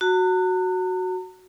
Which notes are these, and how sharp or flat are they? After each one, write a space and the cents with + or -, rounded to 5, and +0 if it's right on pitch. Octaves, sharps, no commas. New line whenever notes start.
F#4 +0 A#5 -45